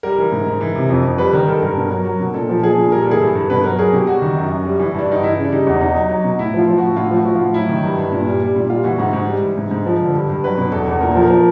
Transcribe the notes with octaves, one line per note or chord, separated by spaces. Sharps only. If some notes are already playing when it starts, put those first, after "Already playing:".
G3 A#4
E3
G#2
G#2
E3
C3
F2
F2
G3 B4
D#3 A#4
G2 A4
G2 A#4
B2
F#3
F#3
B2
A#2 A4
F3
F3 G#4
A#2
G3 A#4
A4
E3 G#4
G2 A4
G2
B2 B4
F#3 A#4
F#3 G#4
B2 G4
G3 F#4
D#3
F#2
F#2
G3
E3
G2 D4
G2 D#4
E3 E4
C#3
D4
G3 D#4
E2
B2 D#4
F#3
F#3
B2
A2 E4
F3
F4
F3
A2 F#4
A2 F4
F3
F#4
F3
A2 F4
F#3 E4
D#3
G2
G2
A#2
G3
G3
A#2
G3 F4
E3 F#4
G#2 F#4
G#2
G3
E3
G#2
G#2
F3
D3
G2
G2
F#3 B4
B2
E2 A4
E2
A#2 A#4
F3 A4
A#4
F3